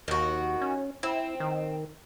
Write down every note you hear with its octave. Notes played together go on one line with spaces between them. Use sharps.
D#2 D#3 F#4
C#4
C4 E4
D#3